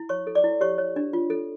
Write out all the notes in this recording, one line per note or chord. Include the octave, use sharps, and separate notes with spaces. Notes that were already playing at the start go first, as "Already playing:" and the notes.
Already playing: E4
C#5 C#6
A4
D5 D6
E4
G4 C#5 C#6
C#5
D4
F4
A4